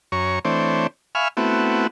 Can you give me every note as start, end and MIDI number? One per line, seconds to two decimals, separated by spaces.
0.12 0.39 42
0.12 0.39 73
0.12 0.39 82
0.12 0.39 85
0.45 0.87 52
0.45 0.87 57
0.45 0.87 60
0.45 0.87 62
0.45 0.87 72
0.45 0.87 73
1.15 1.28 76
1.15 1.28 77
1.15 1.28 80
1.15 1.28 83
1.15 1.28 85
1.15 1.28 89
1.37 1.87 57
1.37 1.87 59
1.37 1.87 60
1.37 1.87 64
1.37 1.87 66